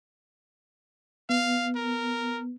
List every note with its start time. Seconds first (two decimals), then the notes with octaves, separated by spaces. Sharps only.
1.30 B3 F5
1.76 A#4